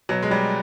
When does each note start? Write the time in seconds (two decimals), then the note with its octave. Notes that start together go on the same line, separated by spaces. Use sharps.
0.09 B2 F#3
0.22 G#3
0.31 F#3 G3